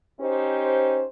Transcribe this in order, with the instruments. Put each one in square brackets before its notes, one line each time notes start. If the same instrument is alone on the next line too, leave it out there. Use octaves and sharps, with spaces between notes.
[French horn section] C#4 D#4 G4 C5